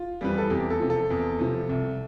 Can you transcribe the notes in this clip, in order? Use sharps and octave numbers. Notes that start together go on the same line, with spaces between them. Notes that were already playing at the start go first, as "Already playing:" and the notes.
Already playing: F4
F2 E3 G3 B4
A4
E2 G4
A4
C3 F3
A4
E2
C3 F3
C2